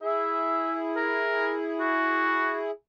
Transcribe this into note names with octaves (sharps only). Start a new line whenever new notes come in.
E4 G#4 E5
A#4
F#4